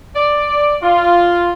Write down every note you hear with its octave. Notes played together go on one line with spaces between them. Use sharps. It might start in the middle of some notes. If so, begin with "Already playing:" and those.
D5
F4